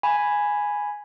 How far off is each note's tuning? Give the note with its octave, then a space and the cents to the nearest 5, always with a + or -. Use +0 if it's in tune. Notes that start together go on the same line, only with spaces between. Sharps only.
G#5 +0 B5 +0